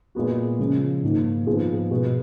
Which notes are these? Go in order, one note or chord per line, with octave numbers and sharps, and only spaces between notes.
A#2 G#3 B3 F#4
C#3 F3 G#3
G#2 D#3 A#3
G#2 F3 B3 F4 G#4
B2 G#3 B3 F#4